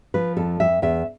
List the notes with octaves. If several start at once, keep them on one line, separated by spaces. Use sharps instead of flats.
F3 B4
F2 A4
F2 E5
E2 E5